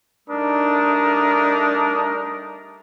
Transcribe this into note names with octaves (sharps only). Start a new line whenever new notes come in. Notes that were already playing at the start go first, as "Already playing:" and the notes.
G3 A3 D4 D#4 A#4 D#6